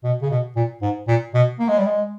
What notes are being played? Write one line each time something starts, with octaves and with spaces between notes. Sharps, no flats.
B2
C#3
B2
A#2
G#2
A#2
B2
A#3
G#3
G3
G#3